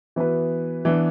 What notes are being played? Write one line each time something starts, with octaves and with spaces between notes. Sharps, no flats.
E3 B3 F#4 B4
E3 B3 D4